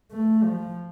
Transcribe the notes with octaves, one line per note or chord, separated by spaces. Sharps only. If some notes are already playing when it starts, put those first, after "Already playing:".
A3
F3